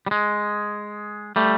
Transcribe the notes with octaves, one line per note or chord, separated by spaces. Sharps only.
G3
G#3
G3 A3